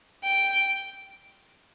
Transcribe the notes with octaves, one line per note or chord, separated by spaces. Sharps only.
G5